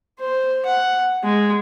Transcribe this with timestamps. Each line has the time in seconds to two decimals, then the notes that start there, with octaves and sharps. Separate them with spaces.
0.19 C5
0.66 F#5
1.23 G#3